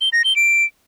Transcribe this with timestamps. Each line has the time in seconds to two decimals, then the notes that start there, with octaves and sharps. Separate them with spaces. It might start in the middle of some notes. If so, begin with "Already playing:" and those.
0.01 G7
0.13 A#6
0.24 G7
0.36 D7